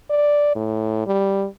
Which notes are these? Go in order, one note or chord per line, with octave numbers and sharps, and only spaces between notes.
D5
A2
G3